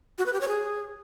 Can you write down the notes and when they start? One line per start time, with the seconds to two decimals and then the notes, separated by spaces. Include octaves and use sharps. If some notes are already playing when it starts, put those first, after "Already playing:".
0.18 F#4
0.26 B4
0.33 G4
0.41 C#5
0.48 G#4